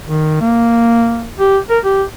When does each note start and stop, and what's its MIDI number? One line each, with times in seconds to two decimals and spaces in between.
0.07 0.37 51
0.41 1.29 58
1.39 1.58 67
1.70 1.79 70
1.85 2.03 67